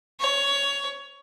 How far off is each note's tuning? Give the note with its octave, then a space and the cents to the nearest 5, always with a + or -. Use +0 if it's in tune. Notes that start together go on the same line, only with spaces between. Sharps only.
C#5 +15